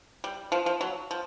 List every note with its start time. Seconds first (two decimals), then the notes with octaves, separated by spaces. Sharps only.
0.24 G3
0.52 F3
0.66 F3
0.81 F#3
1.11 F3